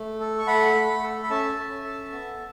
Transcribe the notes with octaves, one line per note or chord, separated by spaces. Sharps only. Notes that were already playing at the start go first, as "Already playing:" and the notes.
Already playing: A3
A4
C#6
A3 F#5 B5
A3
A4
B5
C#4 E5 A5
C#4
A4
B3